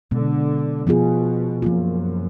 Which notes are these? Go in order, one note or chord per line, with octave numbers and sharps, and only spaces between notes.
B2 D3 G#3 B3
B2 F3 B3 F4 G#4
F#2 F3 A#3 F4